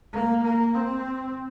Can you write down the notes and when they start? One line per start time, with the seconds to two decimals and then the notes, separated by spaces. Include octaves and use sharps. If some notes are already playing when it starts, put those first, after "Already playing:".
0.13 A#3
0.44 A#3
0.75 C4